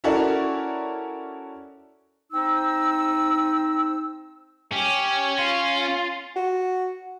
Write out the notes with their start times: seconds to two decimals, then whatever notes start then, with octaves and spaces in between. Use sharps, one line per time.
0.04 C#4 E4 F#4 A4 A#4 D5
2.32 C4 D#4 E6
4.73 C#4 G4
5.39 F4
6.36 F#4